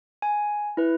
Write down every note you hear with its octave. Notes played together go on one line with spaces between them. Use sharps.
G#5
E4 B4